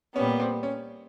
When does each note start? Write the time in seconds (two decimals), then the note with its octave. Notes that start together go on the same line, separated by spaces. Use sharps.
0.15 A#2 G3 B3 C#4
0.39 C4
0.63 C#4